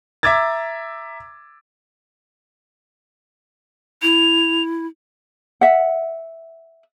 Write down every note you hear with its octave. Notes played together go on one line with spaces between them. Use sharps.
E5 A#5 D6 E6 G#6 A6
E4 F7
E5 F#5